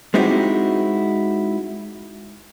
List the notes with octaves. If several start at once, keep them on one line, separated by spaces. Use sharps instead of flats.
G#3 C4 D#4 E4 F#4 G4